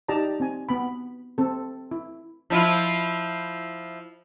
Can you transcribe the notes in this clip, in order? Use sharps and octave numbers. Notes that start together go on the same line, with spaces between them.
D#4 G4 D5 A5 A#5
C4 G#5
B3 B5
C4 A4
E4
F3 E4 F4